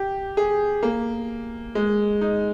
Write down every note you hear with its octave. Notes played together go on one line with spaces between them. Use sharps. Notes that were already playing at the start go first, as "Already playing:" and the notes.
Already playing: G4
G#4
A#3
G#3
D#4